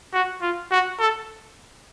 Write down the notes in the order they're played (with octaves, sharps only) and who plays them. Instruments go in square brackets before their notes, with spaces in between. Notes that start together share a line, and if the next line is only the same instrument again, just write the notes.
[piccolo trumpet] F#4
F4
F#4
A4